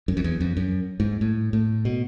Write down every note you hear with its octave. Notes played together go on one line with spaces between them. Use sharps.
F#2
F2
E2
F2
F#2
G#2
A2
A2
B2